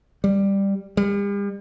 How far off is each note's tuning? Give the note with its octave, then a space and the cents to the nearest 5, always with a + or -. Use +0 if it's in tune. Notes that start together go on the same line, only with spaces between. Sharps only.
G3 +10
G3 +45